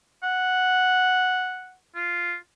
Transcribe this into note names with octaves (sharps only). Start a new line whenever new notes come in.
F#5
F4